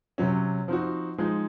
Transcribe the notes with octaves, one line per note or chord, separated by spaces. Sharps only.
C3 F#3 C#4
F3 C4 D#4 F#4
F3 G#3 D#4